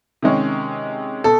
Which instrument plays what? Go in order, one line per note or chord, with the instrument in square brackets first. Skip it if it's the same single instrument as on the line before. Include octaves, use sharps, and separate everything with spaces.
[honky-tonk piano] C3 D#3 G#3 C#4
[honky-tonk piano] B2 [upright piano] A4